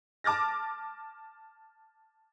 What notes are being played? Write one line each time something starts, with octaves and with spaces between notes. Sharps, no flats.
A5 D6 F6 A6 A#6